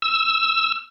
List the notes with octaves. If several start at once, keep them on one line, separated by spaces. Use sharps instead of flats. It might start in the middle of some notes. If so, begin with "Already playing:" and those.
E6